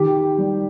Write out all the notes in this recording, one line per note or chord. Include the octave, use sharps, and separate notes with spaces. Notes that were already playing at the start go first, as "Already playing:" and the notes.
Already playing: D#3 G4
G3